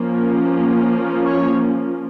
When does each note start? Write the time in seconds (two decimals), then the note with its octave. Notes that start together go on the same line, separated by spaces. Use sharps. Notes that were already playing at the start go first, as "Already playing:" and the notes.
Already playing: F3 A#3 C#4
1.26 C#5